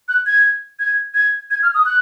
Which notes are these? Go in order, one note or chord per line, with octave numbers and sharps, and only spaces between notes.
F#6
G#6
G#6
G#6
G#6
F6
D#6
F#6